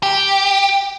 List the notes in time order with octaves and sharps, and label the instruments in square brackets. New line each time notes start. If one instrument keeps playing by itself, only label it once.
[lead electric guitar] G4